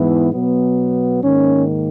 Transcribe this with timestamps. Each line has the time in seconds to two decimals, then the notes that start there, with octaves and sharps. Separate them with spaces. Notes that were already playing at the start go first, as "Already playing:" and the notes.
Already playing: G#2 E3 B3 E4
0.32 B2 F#3 B3
1.22 G#2 D#3 A#3 C#4